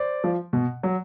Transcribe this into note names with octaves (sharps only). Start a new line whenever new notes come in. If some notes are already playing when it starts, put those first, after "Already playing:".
Already playing: C5 D5
F3
B2
F#3